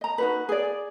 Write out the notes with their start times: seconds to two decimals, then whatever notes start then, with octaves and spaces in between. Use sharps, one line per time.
0.01 D#5 A#5
0.18 D#4 F#4 B4
0.49 G#4 D5